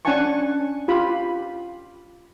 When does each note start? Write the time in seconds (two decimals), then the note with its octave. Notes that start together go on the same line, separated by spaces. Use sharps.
0.05 C#4 D4 F#5 G#5 A5 C#6
0.88 F4 G4 B5